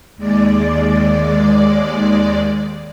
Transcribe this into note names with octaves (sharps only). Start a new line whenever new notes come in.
D#2 G#3 D5